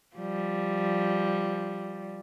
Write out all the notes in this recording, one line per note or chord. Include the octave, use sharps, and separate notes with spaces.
F3 G3